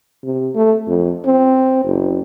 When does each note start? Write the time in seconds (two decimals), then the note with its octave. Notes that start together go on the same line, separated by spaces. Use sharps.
0.24 C3
0.55 A3
0.88 F2
1.25 C4
1.85 F#1